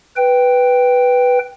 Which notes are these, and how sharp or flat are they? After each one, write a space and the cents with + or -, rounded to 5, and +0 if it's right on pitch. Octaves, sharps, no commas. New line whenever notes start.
B4 +0 G5 +0